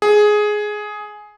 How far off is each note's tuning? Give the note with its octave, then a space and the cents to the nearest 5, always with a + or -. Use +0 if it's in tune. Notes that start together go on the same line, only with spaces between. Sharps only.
G#4 +10